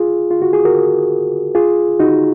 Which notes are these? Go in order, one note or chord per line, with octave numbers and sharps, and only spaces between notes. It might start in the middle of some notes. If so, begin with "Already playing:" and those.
Already playing: F4 G#4
F4
F#4
G#4
F#4 A#4
F4 G#4
D#4 F#4